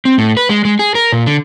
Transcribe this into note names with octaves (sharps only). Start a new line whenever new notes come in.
C4
A2
B4
G#3
G#3
G#4
A#4
A#2
D3